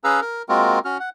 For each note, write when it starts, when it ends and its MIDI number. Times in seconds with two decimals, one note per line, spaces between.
0.04 0.20 61
0.04 0.20 68
0.04 0.20 71
0.04 0.20 77
0.04 0.20 82
0.04 0.20 88
0.21 0.42 70
0.49 0.79 56
0.49 0.79 58
0.49 0.79 60
0.49 0.79 65
0.49 0.79 66
0.49 0.79 70
0.85 0.98 61
0.85 0.98 66
0.85 0.98 89
1.00 1.09 78